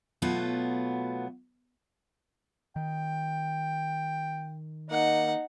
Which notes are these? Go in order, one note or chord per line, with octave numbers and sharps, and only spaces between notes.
B2 F#3 A3 B3 F4 F#4
D#3 G5
A#3 D#4 F#5